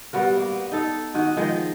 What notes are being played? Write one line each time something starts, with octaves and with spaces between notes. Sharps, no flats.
G3 B3 F#4 A#4
A#3
B3
D#4 A4
D#3 F#4
D#3 F3 G#3